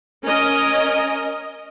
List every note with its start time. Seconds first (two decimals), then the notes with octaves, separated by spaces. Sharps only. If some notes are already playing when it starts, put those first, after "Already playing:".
0.24 C#4 A#4 D#5